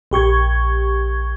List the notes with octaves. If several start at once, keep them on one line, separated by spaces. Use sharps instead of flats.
A#1 G4 C#6 G#6